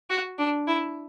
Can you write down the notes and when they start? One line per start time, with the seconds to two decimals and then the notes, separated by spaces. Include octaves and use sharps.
0.10 F#4
0.39 D4
0.67 E4